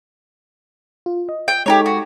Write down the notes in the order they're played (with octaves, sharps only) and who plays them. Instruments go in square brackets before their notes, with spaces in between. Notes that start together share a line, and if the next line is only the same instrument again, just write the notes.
[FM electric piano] F4
D#5
[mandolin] G5
[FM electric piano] G#3 D#4 A4 [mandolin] G4 A#4 C#5
[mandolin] F#4